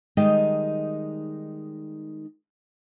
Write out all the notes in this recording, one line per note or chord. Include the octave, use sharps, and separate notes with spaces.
D#3 G3 G#3 D#4 D#5 G5